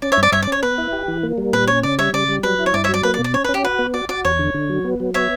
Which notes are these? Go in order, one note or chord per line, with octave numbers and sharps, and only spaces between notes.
C#4 D5
C#5 E5
G2
D5
G2 C#5 E5
D5
C#4 C#5
B3 B4
E4
G4
E3
A#3
G3
A#2 B4
C#4 C#5
C#3 D5
G3 C#5 E5
C#3 D5
G3
F#3 B4
E4
C#5
G2 D5
C#5 E5
F#3
D5
A#3 B4
D5
B2
D5
C#4 C#5
B4
C#4
G4
F#4 B4
B3
F#4 D5
F#4 D5
E2 C#5
D3
D3
F#3
B3
F#3
B3 C#5 E5